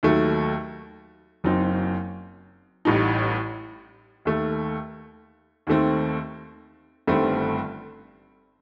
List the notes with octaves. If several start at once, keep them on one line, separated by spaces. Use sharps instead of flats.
D#2 D#3 F#3 A3
F#1 F#2 F#3 C4 D#4
A1 A2 G3 D#4
D#2 D#3 A3
D#2 D#3 A3 C4
G1 G2 D#3 A3 C4